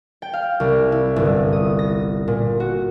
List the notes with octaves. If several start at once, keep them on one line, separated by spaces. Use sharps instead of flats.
G5
F5
C2
E4
G1
D#6
A#6
A#2
F#4